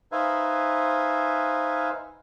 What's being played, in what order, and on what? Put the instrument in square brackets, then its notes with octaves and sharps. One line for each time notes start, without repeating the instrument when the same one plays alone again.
[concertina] D#4 B4 C5 E5 F5 G#5